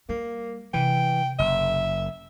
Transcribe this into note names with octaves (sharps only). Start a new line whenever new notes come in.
G3 A#3
C3 E3 G5
F#1 E5